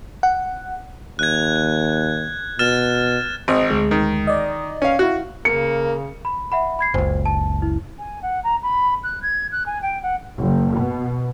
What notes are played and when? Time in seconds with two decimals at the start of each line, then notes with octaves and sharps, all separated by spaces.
0.23 F#5
1.19 D#2 F#6 G#6
2.59 B2 F6 A6 E7
3.48 G#1 C5 D#5
3.70 D2 G#3
3.91 D#3
4.27 D5 D#5
4.82 C#4 F5
4.99 E4 F#4 F5
5.45 C#3 A#3 C#7
6.25 B5
6.52 E5 F#5 B5
6.79 B5 G#6 C7
6.94 F#1 C#2 C5
7.26 A5
7.62 E4
7.99 G#5
8.22 F#5
8.43 A#5
8.63 B5
9.03 F#6
9.22 G#6
9.52 F#6
9.66 G#5
9.82 G5
10.03 F#5
10.37 F#1
10.75 B2